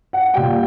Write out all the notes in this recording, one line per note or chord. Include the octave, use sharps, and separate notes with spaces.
F#5
A#2 G3 G5